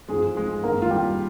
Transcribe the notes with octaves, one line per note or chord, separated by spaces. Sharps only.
G#2 F3 G#3 G#4
G#3 G#4
G#2 D#3 A#3 A#4
F4
G3 G4